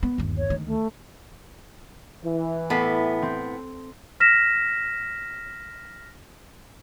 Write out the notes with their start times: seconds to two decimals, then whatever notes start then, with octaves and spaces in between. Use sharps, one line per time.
0.03 B3
0.18 G1 D#2
0.38 C#5
0.50 D2 D#3
0.65 A3
2.24 E3
2.70 A2 B3 A4 B6 C7
3.22 C4
4.20 F6 A#6 B6 E7